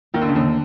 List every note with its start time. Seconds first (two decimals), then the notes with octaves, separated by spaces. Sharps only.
0.14 D#2 D#3
0.21 D3
0.29 C#3
0.35 D#2 D3